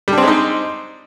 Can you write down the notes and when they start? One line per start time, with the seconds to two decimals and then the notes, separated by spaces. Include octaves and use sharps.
0.08 G3
0.13 D4
0.18 C4
0.23 G#3
0.28 D#4